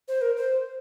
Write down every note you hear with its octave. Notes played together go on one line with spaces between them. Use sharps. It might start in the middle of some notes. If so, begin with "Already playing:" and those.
C5
A#4
C5